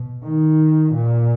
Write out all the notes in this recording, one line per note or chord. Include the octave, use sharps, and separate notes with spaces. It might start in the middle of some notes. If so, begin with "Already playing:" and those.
Already playing: B2
D#3
A#2